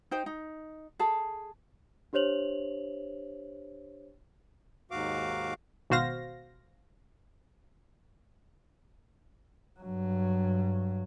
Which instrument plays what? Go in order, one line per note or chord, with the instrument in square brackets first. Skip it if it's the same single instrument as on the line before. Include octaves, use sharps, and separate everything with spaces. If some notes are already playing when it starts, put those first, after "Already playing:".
[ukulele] D#4 C5 G5
D#4
G#4 A4 A5
[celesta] D4 G4 C5 C#5 F7 F#7
[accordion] D#2 G#2 F#4 F5 D6
[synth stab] G#1 B2 F#4 C5 F5 A#6
[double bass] G2 F#3